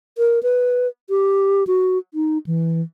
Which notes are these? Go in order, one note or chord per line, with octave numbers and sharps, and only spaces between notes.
A#4
B4
G4
F#4
D#4
E3